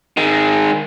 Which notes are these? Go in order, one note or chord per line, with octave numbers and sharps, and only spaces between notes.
D#3 G#3